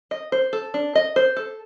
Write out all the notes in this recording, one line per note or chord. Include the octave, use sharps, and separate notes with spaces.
D#5
C5
A4
D4
D#5
C5
A4